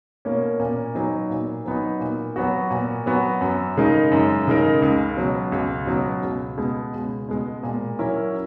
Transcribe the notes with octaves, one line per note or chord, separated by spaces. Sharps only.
B2 A#3 C#4
A#2
F#3 B3 D#4
A#2
F#3 B3 D#4
A#2
F#3 B3 F#4
A#2
F#3 B3 F#4
F#2
C#3 G#3 D#4 A#4
F#2
C#3 G#3 D#4 A#4
C#2
B2 F#3
C#2
B2 F#3
C#2
B2 G#3
C#2
B2 G#3
A#2
F#3 C#4 E4 A#4